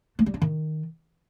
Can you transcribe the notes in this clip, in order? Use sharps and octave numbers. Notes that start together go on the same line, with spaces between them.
A3
G3
D4
D#3